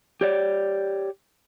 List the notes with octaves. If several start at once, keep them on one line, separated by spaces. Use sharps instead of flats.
G4 C#5 D5